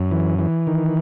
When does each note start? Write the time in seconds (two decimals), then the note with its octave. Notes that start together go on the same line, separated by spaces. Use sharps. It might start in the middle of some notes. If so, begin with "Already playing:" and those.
Already playing: F#2
0.11 E3
0.39 E3
0.67 D#3